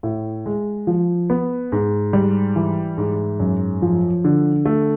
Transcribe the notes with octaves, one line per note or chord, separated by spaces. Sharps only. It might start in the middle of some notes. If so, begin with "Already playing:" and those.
A2
G#3
F3
B3
G#2
G3
E3
G#2
F#2
F3
D3
A3